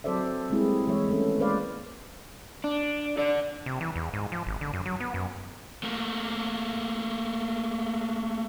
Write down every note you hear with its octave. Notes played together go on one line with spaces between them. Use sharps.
F#3 C4 A4 C5 D5 E5
G3 G#3 A#3 C4 E4 G#4
E3 G#3 C#5 E5
D#3 A3 B3 C#4
G#3 A#3 B4 C5 D5 F5
D4
A4 D5
C3
E3
E2
G#2
F3
G#1
D3
F#2
F#3
B3
F#2
A3 A#3